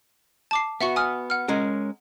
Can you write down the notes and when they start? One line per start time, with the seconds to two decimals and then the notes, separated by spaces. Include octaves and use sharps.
0.51 A5 D6 C7
0.81 B3 F#4 E5 F#5 C#6
0.96 G#5 D#6 F6
1.30 F#5 F6
1.48 G#3 C#4 A#4